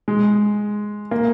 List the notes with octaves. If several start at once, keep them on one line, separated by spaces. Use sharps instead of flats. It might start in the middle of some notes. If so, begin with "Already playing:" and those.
G#3
A#3